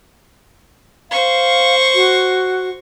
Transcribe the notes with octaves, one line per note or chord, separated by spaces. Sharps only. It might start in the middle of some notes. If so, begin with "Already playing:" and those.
C5 F5 C#6
F#4